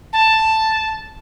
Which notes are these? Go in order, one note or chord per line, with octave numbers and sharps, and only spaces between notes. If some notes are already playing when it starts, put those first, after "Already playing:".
A5